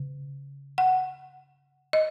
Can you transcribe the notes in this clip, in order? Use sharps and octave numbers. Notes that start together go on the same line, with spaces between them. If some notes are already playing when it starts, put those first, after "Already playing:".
Already playing: C#3
F#5
D#5